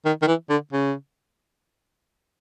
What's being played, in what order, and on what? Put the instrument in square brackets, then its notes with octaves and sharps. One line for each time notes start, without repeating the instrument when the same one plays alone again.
[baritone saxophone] D#3
D#3
E3
D3
C#3